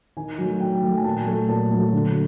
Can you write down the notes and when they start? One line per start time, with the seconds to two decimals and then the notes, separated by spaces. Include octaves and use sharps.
0.17 D#3 G#5
0.38 F#3 A3
0.60 D#3 G5
0.83 F#3 A3
0.97 G#5
1.04 A#2 A5
1.26 F#3 A3
1.48 A#2 A5
1.71 F#3 A3
1.92 D3